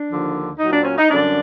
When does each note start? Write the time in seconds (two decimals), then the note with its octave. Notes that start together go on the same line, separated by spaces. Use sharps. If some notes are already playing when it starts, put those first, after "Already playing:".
Already playing: D4
0.09 D#2 D3 F3
0.59 A#2 F#3 D#4
0.72 D4
0.81 C4
0.85 C#4
0.98 D#4
1.11 F#2 D3 G3 D4